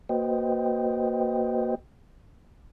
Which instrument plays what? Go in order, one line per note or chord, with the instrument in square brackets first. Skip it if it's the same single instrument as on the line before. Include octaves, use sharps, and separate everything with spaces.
[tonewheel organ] A#3 F#4 B4 C5 D#5 G5